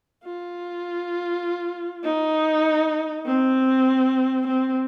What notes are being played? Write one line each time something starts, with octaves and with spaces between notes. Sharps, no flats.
F4
D#4
C4
C4